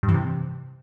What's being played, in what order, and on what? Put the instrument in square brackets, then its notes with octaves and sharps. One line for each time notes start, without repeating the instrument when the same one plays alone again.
[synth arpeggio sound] G2
E3
C3